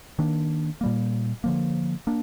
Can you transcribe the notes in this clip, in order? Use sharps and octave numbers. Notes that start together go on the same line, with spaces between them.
D#3 A#3 D4
A#2 G3 A#3
D3 F3 A#3
A#3 D4